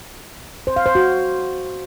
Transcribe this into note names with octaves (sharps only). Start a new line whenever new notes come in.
C5
F5
C5
F#4